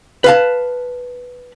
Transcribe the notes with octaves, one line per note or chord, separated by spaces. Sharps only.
B4 F5 A5